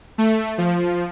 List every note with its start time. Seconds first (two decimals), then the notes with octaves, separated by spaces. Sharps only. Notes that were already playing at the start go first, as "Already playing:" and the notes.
0.18 A3
0.58 F3